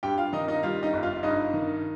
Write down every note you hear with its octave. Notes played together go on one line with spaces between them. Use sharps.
G2 G4 G5
F4 F5
D#3 D#4 D#5
D#4 D#5
G3 F4 F5
D#4 D#5
G1
F4 F5
G2 D#4 D#5
D#3